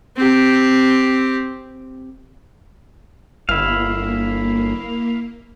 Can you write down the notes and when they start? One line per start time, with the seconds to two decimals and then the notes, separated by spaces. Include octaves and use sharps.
0.17 C4 G4
3.49 G1 A#3 E4 F5